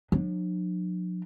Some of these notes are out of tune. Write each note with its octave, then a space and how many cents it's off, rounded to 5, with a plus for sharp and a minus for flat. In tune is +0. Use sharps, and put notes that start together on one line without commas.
F#3 -45 D4 +45